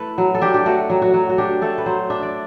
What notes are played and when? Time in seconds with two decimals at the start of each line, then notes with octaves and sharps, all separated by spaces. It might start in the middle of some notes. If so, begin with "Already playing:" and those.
Already playing: A3 E4 A4 B4
0.18 F#3
0.35 A4
0.41 D4 G4
0.54 G4
0.66 A3 F#4
0.90 F#3
1.02 F#4
1.14 F#3
1.29 F#4
1.38 D4 G4
1.62 A3 A4
1.78 B4
1.86 F#3 C5
2.10 D4 E5
2.22 D5